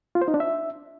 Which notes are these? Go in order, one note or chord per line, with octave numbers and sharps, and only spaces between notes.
F4
C5
D#4
D4
E5